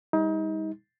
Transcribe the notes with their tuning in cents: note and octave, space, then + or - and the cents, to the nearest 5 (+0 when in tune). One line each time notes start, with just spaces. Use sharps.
G3 +35 D#4 +35